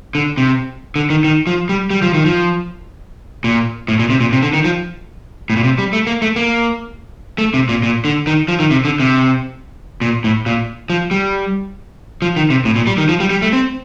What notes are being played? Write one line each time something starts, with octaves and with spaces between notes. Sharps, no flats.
D3
C3
D3
D#3
D#3
F3
G3
G3
F3
D#3
F3
A#2
A2
A#2
C3
A#2
C3
D3
D#3
F3
A2
A#2
C3
G3
A3
A#3
A3
A#3
A3
C3
A#2
A#2
D3
D#3
F3
D#3
C3
D3
C3
A#2
A2
A#2
F3
G3
F3
D#3
C3
A2
A#2
G3
D#3
F3
G3
G3
A3
C4